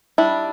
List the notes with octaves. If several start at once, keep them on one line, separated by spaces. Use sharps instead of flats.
G3 D4 E4